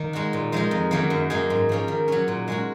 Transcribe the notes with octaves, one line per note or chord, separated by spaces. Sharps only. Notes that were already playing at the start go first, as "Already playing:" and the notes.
Already playing: D#3 A#3
G#3 D#4 F#4
A#2
F3 G#3 D#4 A#4
F2
D#3 F#3 A#3 C#4
F#2
D#3 A#3 D#4 G#4
G#2
F3 A#3 C#4
D#3
F#3 C#4
A#2
G#3 C#4 F#4